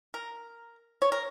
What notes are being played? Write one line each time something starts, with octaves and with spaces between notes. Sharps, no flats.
A#4
C#5
A#4